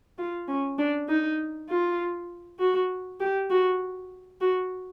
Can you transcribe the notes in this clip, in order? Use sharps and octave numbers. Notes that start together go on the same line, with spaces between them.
F4
C#4
D4
D#4
F4
F#4
G4
F#4
F#4